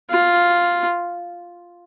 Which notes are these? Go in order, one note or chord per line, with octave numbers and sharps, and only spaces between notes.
F4